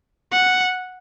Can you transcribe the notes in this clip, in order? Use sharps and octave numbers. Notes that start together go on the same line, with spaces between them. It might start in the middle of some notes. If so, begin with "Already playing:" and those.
F#5